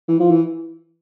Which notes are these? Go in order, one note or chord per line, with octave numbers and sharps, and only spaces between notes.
E3
F3
E3